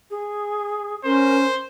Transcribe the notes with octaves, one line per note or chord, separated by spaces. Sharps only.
G#4
C#4 A#4 C5